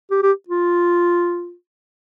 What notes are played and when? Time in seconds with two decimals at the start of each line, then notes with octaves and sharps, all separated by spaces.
0.11 G4
0.23 G4
0.48 F4